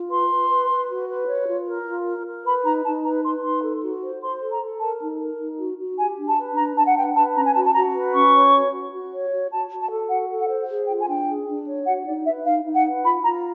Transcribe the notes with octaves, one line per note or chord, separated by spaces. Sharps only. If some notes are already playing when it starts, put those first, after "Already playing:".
Already playing: F4
B4 C6
B4
B4
B4
F#4
B4
C#5
F4
A#4
F4
A#4
A#4
B4 B5
D#4 A#5
D#4 A5
B4 A#5
B4 C6
D#4 C6
A4
F#4
C5
C5 C6
A4
A#5
A4
A#4 A5
D#4
A#4
D#4
F#4
F#4
G4 G#5
D4
A5
B4
D4 A#5
D4 A5
F#5
B4 G5
B4 A5
C#4 A#5
G#5
F#4 A5
A5
F#4 A#5
B4
C#4 C#6
C#5
F#4
F#4
F#4
C#5
F#4
F#4 A5
F#4
A5
A4
F#4 F#5
A4
F#5
C5
G#4
F4 G5
G#5
D4 G5
G#4
D4
C#5
F#4 F#5
D#4 D5
B4 E5
D#4 F5
D#4
F#5
B4
F4 B5
F4 A#5